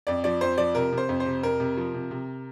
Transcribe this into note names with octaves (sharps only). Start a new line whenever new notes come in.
F2 D5
F3 D5
F2 C5
F3 D5
C3 A#4
C3
C5
F2
C5
C3
F2 A#4
C3
F3
C3
C3